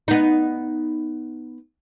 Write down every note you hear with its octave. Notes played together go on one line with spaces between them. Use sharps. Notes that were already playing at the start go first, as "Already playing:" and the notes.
B3 D#4